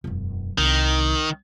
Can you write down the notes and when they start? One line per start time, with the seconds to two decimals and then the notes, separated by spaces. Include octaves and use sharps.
0.04 E1 F#2
0.58 C2 D#3